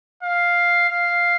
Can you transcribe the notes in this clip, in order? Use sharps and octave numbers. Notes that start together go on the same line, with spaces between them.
F5
F5